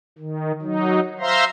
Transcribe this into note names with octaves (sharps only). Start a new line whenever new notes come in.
D#3
F#3 D#4
C5 E5 F5 A#5 C6